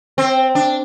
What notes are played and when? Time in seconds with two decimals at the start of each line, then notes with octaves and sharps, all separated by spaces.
0.18 C4
0.55 D4